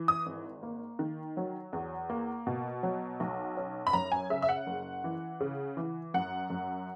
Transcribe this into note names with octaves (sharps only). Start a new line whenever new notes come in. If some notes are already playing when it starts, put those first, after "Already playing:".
Already playing: E3
D#6
G#1
A#3
D#3
F#3
E2
A#3
B2
F#3
B1
C#4
B5
F#2 A#5
G#5
C#3 E5
E5
F#5
F#1
E3
C#3
E3
F#2 F#5
F#2